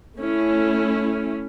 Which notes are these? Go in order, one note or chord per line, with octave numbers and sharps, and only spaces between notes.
A3 C#4 E4